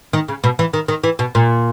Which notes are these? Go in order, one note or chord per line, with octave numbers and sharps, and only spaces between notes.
D#3
C#3
B2
E3
D#3
D#3
E3
B2
A#2